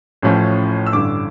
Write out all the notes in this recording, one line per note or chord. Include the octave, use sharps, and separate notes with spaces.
A1 A2 F3 C#4
E6
A1 G2 D3 D6